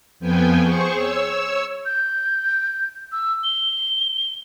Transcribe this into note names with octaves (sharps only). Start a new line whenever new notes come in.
F2 F3 B3 G5 G#5
G#4 C5 C#6
C#5 E6
G6
E6
G7